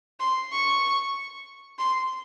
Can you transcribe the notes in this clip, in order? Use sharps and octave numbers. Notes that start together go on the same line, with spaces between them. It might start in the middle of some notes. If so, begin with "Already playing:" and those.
C6
C#6
C6